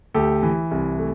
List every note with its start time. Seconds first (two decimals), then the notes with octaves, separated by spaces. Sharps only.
0.14 D2 G4 A4
0.43 E3
0.71 C2
0.99 A3